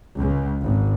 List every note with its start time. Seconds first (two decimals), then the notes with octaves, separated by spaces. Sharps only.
0.18 C#2
0.62 G#1